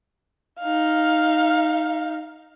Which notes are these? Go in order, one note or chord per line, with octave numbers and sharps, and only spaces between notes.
D#4 F5